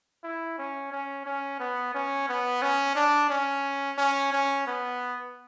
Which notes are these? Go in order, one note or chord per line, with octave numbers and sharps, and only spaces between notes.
E4
C#4
C#4
C#4
B3
C#4
B3
C#4
D4
C#4
C#4
C#4
B3